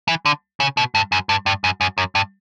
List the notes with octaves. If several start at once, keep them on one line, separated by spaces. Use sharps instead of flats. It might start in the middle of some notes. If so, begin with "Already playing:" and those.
E3
D3
C#3
B2
G2
F#2
G2
G2
F#2
F#2
F#2
G2